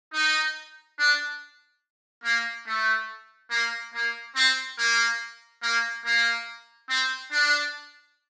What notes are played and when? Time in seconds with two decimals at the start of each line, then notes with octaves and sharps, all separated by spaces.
0.13 D#4
0.98 D4
2.24 A#3
2.67 A3
3.51 A#3
3.93 A#3
4.36 C4
4.78 A#3
5.62 A#3
6.05 A#3
6.89 C4
7.32 D4